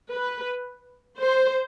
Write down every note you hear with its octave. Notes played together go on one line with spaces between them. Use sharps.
B4
C5